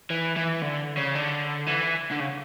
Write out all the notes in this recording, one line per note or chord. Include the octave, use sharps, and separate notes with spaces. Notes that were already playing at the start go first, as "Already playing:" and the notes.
E3
E3
D3
C#3
D3
E3
D3
C#3